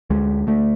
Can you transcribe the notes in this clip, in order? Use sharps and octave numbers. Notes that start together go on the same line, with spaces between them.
D2 G#3
D2 A3